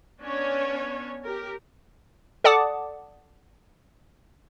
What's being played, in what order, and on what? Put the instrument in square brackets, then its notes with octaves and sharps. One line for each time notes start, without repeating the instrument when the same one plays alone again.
[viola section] B3 C#4 D4 C#5
G4 A#4
[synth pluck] A4 D5 F#5 A5 D6 D#6